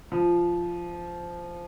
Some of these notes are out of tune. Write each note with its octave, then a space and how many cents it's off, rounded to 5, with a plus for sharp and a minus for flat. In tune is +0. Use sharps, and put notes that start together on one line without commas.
F3 -10